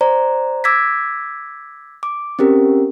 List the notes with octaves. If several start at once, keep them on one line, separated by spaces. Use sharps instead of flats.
C5 D5 A#5
D6 E6 G#6 A#6 B6
D6
C4 C#4 G4 A#4